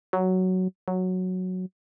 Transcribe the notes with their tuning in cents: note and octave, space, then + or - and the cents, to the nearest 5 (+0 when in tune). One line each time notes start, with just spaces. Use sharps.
F#3 +5
F#3 -5